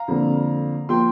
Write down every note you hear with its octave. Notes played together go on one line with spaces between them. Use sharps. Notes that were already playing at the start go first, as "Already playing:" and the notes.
Already playing: F5 A#5
F2 D3 A#3
F3 A#3 G5 C6